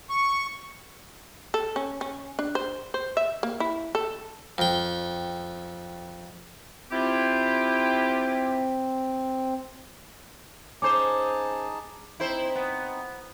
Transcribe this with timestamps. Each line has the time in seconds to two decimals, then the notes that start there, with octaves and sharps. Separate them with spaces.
0.09 C#6
1.54 A4
1.76 C#4
2.01 C#4
2.39 D4
2.55 C5
2.94 C5
3.17 E5
3.43 A#3
3.60 E4
3.95 A4
4.58 F2 G5
6.91 C4 E4 F4 G4
10.82 C#4 D#4 G#4 C5 A5 D6
12.20 C4 D#4 E4 C5
12.55 B3